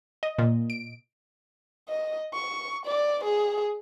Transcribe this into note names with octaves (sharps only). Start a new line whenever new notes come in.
D#5
A#2
D7
D#5
C#6
D5
G#4